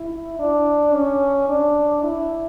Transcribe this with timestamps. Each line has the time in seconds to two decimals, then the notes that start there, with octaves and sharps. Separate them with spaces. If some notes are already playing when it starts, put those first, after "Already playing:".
Already playing: E4
0.39 D4
0.94 C#4
1.48 D4
2.02 E4